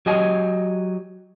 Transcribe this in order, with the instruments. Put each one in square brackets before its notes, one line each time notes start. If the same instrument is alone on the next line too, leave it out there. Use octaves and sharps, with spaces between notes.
[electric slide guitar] F#3 G4 D#5 G#5